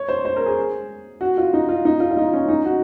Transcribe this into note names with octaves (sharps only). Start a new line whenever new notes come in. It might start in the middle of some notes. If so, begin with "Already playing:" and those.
Already playing: C#5
C5
C5
A#4
G#4
F#4
F4
D#4
F4
D#4
F4
F4
D#4
C#4
D#4
F#4